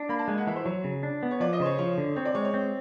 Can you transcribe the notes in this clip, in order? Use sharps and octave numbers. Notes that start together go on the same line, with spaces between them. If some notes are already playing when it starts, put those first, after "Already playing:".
Already playing: D4
A#3 B5
A5
G#3 G#5
F#5
E3 E5
C5
F#3 C#5
C#3
D4
B3
C#5
F3 D5
D#5
C#3 C5
C#5
F3 C#5
D3
C4 C#5
D5
G#3 C#5
C#5
C4